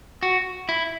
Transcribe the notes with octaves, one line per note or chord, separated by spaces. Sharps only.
F#4
E4